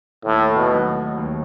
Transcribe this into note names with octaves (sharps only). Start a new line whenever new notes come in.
D#2 A2
B2
D#3 F#3 A3
D#2